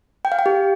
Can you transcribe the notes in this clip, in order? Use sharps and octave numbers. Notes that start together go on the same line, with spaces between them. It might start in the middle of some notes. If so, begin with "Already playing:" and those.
G5
F5
G5
G4